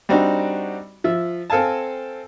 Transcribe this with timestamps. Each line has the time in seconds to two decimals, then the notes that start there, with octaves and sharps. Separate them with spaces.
0.09 G3 C4 D4 D#4 F#4
1.04 F3 E5
1.50 C4 A4 F5 G#5 A5